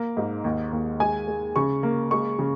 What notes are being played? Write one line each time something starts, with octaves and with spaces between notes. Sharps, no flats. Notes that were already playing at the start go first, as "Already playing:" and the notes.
Already playing: A#3
G#2
D#2
D#2
G#3 G#5
G#3
C#3 C#6
A#3
G#3 C#6
C#3